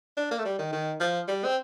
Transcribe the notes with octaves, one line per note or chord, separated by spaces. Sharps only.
D4
A#3
A3
G3
D#3
D#3
F3
G3
C4